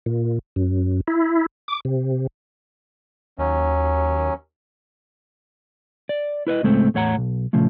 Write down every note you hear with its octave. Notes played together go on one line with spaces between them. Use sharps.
A#2
F#2
E4
D6
C3
D#2 F#3 C#4
D5
E4 B4 C#5 D#5
C#2 A2 G#3 A3 C4
E2 A2 C#5 F#5 A#5
B1
A#2 C#3 F3 A3